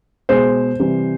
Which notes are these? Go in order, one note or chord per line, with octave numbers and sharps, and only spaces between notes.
B2 G#3 C5
C3 E3 G3